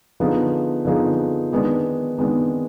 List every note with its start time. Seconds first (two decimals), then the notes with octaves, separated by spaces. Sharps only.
0.20 D3 F3 B3 D#4 G#4
0.85 D3 F3 B3 D#4 G#4
1.52 D#3 G#3 B3 D4
2.18 D#3 G#3 B3 D4